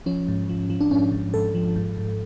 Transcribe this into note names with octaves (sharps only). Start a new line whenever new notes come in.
F3 C#4
G#2
F3
F3
D4
G#2 C#4
G#2
G#2 A4
F3
G#2
G#2